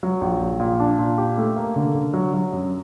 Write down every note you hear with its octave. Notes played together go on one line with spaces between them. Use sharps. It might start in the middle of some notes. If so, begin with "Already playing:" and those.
F#3
A#1
A#1
A#2
D4
A#2
G4
A3
A#3
D3
D3
F#3
F#3
F#2